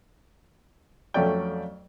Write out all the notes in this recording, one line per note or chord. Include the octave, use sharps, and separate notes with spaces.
F2 F#3 A3 C#4 D5 G5